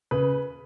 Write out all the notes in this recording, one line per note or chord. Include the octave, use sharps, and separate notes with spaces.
C#3 B4